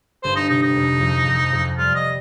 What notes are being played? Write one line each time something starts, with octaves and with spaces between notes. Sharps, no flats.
G1 C5
D#4
C3 D#4
D#4
F2
F2
F2
F2
G3 F4
D#5